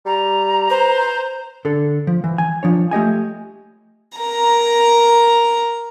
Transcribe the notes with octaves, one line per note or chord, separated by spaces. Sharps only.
G3 A#5
B4 C5
D3 A4
F3
E3
G#5
F3 D4 C#5
A3 G4 D#5 G#5
A#4 A#5